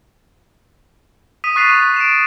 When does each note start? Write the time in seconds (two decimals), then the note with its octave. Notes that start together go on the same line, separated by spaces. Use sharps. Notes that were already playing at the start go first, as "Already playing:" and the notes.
1.44 D#6 B6 D#7
1.56 C#6 F#6 A6 C7 D#7 F7
1.97 D7 E7